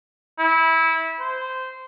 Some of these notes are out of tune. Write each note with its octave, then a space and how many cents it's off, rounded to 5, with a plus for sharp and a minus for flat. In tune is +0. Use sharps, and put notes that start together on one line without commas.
E4 -20
C5 -15